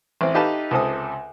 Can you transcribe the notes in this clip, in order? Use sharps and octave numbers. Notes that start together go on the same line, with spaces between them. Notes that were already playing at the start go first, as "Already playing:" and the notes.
A1 C4
D#4 G4 A4 B4 F5 A5
C#2 C3 A4 C5 D#6